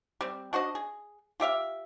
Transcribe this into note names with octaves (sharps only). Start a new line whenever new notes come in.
G3 C4
D4 F#4 C5 D#5
G#4
F4 G4 E5 F5